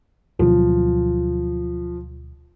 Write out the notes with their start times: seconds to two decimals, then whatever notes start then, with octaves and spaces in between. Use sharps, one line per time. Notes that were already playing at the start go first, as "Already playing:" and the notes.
0.39 D2 B2 F3 F#3